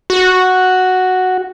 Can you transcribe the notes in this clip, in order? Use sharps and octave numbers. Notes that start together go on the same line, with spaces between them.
F#4